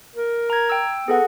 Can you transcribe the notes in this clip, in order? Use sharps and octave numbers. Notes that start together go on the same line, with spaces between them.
A#4
A#5 G#6
G5 E6
B3 G#4 A4 F#5